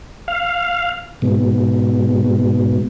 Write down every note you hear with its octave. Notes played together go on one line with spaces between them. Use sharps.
F5
G#2 B2